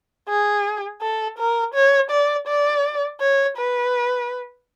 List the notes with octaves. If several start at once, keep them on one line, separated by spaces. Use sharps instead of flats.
G#4
A4
A#4
C#5
D5
D5
C#5
B4